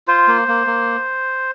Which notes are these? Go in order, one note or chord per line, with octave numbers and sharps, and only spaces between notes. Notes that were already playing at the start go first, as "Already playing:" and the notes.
F4 C5
A#3
A#3
A#3